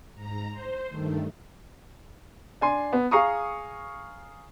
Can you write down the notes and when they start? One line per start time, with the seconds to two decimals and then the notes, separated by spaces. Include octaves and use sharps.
0.14 G#2 A#5
0.50 C5
0.88 G2 D#3 A3
2.61 D4 G#5 C6
2.93 B3
3.11 G#4 F5 A#5 C#6 D#6